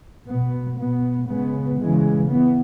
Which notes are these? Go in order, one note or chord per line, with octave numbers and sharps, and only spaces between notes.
B2 B3
B2 B3
C#3 G#3 B3
C#3 E3 G#3
E3 B3